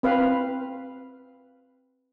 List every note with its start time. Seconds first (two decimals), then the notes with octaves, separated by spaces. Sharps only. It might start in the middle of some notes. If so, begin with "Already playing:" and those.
0.03 C4 B4 F5